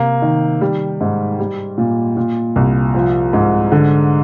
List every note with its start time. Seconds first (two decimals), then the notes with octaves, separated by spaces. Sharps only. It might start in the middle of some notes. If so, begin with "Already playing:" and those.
Already playing: C3 A#3
0.22 D#3
0.61 G3
1.01 G#2
1.40 G3
1.78 A#2
2.17 A#2
2.56 C2
2.95 F3
3.33 G#2
3.72 D3